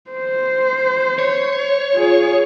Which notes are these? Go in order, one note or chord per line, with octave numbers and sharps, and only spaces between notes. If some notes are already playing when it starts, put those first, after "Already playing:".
C5
C#5
F4 G#4